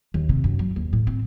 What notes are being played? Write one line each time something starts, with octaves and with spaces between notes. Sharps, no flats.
D#2
C3
F#2
F#3
D#2
A2
C4